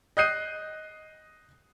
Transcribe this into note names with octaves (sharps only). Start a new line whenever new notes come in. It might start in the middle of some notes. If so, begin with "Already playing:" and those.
D#5 D#6 F#6 G6 C7 D#7